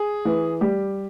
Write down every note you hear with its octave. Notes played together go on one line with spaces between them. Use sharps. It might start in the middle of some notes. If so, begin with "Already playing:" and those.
Already playing: G#4
E3
G3 G4